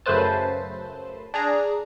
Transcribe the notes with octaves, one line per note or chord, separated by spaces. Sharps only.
F#2 C#3 A3 B4 C5 A5
D4 G#4 A#5